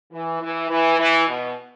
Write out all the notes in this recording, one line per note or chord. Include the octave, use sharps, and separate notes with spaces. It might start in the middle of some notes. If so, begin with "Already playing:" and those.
E3
E3
E3
E3
B2